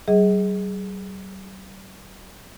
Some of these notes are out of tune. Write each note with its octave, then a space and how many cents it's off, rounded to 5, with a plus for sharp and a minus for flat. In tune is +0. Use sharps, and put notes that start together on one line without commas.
G3 -45 G#4 +5 D#5 +30